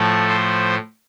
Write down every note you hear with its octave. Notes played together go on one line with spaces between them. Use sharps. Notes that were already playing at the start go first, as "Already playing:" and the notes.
Already playing: A2 F3 A3 A4
C5